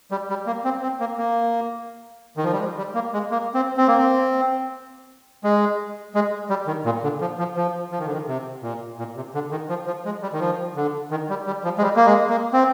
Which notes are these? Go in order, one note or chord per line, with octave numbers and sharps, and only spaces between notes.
G3
G3
A#3
C4
C4
A#3
A#3
D#3
F3
G3
G#3
G3
A#3
G#3
A#3
C4
C4
A#3
C4
G#3
G#3
G3
D#3
A#2
D3
F3
F3
F3
F3
D#3
D3
D#3
C3
A#2
A#2
C3
D3
D#3
F3
F3
G#3
G3
D#3
F3
D3
D#3
G3
G3
F3
G#3
G3
A#3
G#3
A#3
C4